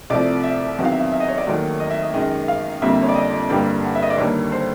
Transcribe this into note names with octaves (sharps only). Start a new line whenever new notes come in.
C2 C3 F3 A3 D5
E5
E2 C3 D#3 F#3 F#5
F5
E5
F5
E5
D#5
C#5
D5
D#2 D#3 F#3 A3
D#5
E5
D#5
F#2 D#3 G#3 D#5
F5
F2 D3 G3 A#3 E5
C#5
D5
D#5
G2 D3 G3 A#3 G5
F#5
E5
D#5
D5
D#2 D3 G3 A#3 C#5
C5